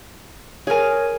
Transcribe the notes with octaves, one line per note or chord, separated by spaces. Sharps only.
G#4 A#4 C#5 G#5